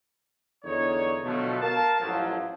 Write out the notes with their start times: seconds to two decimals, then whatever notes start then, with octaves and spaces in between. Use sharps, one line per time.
0.64 E2 D3 D#4 C#5
1.23 B2 D3 F3 F#3 A3
1.61 A#4 F5 A5
2.00 A1 F3 F#3